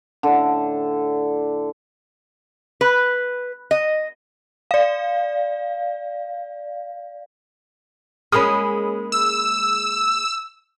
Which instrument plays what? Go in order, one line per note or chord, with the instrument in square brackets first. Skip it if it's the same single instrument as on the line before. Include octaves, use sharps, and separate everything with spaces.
[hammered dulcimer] A2 D3
[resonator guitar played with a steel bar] B4
D#5
[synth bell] D5 F5
[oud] G#3 A#3 C#4 [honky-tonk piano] B5 D#6
[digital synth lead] E6